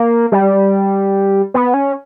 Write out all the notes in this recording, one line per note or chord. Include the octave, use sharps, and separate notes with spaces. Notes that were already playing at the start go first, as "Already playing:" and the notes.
Already playing: A#3
G3
B3
C#4